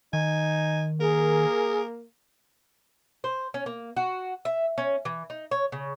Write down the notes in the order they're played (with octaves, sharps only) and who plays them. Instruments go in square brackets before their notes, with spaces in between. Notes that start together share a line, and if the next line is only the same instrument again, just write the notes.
[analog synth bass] D#3 [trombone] D#4 [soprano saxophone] G#5
[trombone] A#3 [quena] G#4 [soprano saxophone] A#4
[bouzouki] C5
C#4
A#3
F#4
E5
C#4
E3
D#4
C#5
C#3